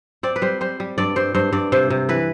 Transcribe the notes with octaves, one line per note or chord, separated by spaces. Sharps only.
C4 D5
B4
G3 C5
G3 C5
G3
G2 D5
G2 C5
G2 C5
G2 D5
C3 C5
C3
E3 B4